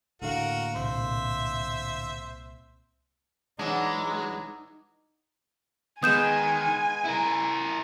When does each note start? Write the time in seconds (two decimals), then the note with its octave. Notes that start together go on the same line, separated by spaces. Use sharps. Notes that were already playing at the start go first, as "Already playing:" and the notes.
0.22 D2 A2 D3 A#3 F#4 A#4 F5
0.76 C2 A#2 C5 E5
3.59 E3 F#3 G#3 D4 D#4
6.03 D#3 G#3 B3 G#5 D#6 G6 E7
7.04 E4 A#4